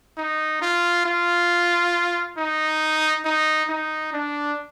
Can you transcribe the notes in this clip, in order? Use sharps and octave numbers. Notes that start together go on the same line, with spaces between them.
D#4
F4
F4
D#4
D#4
D#4
D4